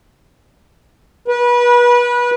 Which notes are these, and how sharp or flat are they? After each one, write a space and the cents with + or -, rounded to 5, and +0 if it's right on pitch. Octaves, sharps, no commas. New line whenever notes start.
B4 -30